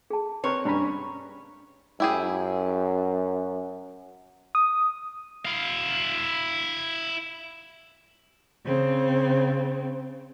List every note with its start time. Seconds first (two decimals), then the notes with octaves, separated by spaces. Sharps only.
0.10 G#4 A5
0.44 C4 A#4 B4 C#5
0.65 G2 C#4 D4 A#5 B5
2.00 F#2 E4 G4 G#4
4.55 D#6
5.45 E4 F5
8.65 C#3 C4